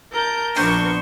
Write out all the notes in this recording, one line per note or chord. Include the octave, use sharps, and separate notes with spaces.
A#4 A5 G6
A#1 B3 D4 C5 C#6